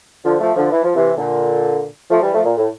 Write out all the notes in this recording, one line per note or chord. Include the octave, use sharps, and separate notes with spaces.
D3 F3
F3 A3
D3 F3
E3
F3
C3 E3
A#2 D3
F3 A3
E3 G3
F3 A3
A#2
A2